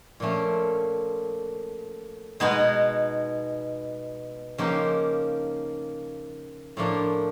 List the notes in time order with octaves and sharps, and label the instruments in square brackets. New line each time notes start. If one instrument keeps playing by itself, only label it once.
[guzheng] A#2 F3 A3 C#4
B2 G#3 B3 D#4 G#4
C#3 F3 A#3 D#4 G4
A2 F3 A#3 D4